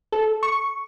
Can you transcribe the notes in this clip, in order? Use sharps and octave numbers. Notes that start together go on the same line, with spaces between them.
A4
C#6